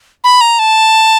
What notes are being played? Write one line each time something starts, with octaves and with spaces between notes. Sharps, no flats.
B5
A#5
A5